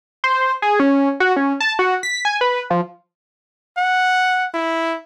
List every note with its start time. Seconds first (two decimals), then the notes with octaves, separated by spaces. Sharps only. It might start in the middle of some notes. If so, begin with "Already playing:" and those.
0.24 C5
0.62 G#4
0.80 C#4
1.20 F#4
1.36 C#4
1.60 A5
1.79 F#4
2.03 B6
2.25 G#5
2.41 B4
2.70 F3
3.77 F#5
4.54 E4